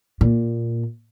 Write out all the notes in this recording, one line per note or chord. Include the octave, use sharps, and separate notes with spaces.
A#2